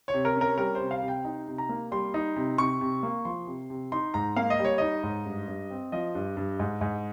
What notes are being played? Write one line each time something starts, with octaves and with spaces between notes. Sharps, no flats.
C#5
C3
A#4
C#4 A#4
G3 A#4
C5
C3
F5
C3
G5
D#4
C3
A#5
A#3
G3 C6
D#4
C3
C3 C#6
C3
A#3
F3 C6
C3
C3
D#4 C6
G#2 A#5
A#3 F5
D#5
G3
C#5
D#4 D#5
G#2
G2
G2
C4
F3 D#5
G2
G2
G#2
G#2